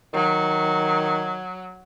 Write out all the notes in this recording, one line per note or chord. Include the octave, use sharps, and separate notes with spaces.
D#3 F#3